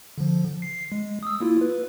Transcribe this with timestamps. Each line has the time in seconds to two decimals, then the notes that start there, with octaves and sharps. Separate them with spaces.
0.18 D3 F3
0.62 C7
0.92 G#3
1.23 D#6 E6
1.41 A#3 E4 F4
1.61 B4